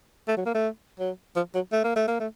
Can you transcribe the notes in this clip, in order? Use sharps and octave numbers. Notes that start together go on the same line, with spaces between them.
A3
F#3
A#3
A3
F#3
F3
F#3
A3
A#3
A3
A#3
A3